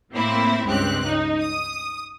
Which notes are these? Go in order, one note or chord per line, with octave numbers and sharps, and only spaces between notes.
A2 A#3 C4 E4
C#2 G2 C4 G4 F#6
D#4
D#6